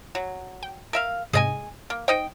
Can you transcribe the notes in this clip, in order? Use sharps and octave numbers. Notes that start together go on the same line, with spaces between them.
F#3
G5
A#4 E5 F5
G#2 C3 G#4 D#5 G#5 D7
A#3
D#4 C5 D#5 G5